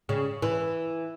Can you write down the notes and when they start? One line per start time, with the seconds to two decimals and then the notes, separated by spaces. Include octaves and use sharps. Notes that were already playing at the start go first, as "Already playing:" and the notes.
0.09 C#3
0.42 E3